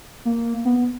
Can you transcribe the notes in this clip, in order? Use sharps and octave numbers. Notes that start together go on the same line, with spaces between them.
A#3
B3